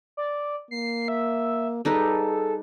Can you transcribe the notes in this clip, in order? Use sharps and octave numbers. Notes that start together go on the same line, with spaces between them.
D5
A#3 C7
E5
G3 D#4 G#4 A4 B4